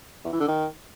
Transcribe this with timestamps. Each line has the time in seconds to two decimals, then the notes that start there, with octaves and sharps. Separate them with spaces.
0.25 E2
0.32 E3
0.40 D3
0.48 D#3